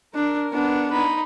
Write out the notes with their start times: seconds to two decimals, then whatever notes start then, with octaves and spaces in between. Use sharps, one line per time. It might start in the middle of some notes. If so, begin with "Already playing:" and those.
0.15 D4 A#4
0.52 B3 D4
0.91 D#4 B5